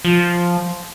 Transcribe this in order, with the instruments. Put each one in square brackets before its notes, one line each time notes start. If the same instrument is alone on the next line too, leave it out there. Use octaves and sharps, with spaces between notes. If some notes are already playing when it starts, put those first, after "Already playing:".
[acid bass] F3